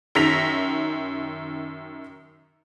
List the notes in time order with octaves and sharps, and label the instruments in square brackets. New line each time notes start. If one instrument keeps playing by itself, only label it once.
[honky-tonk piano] F#2 D#3 A#6 B6 F7